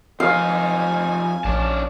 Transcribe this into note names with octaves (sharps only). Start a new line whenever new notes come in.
F2 D#4 F5 G#5
A#1 C#4 D4 A5